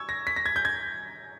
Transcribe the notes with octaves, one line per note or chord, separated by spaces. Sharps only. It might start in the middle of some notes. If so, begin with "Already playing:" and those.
Already playing: C#6 E6 G#6
A#6
B6
A#6
G#6
G6
G#6